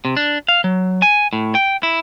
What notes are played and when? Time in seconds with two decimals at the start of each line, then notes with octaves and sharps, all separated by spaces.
0.05 C3
0.17 D4
0.49 F5
0.64 F#3
1.02 G#5
1.33 A2
1.55 G5
1.83 E4